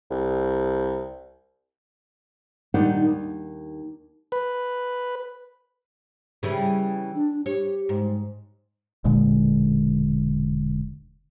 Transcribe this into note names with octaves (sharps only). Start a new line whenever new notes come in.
C2
A#2 D#3 G3 D4 D#4 F#5
D#2
B4
C#3 E3 G3
D4
G4 C#5
G#2
E1 A#2 D3 G#3